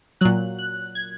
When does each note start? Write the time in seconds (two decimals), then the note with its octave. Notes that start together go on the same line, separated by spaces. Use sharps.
0.21 A#2 F#3 F#6
0.59 F#6
0.95 G#6